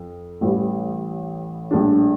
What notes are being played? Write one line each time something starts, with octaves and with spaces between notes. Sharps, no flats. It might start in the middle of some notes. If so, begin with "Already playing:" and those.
Already playing: F2
A1 A2 E3 G3
A#1 A2 G3 D4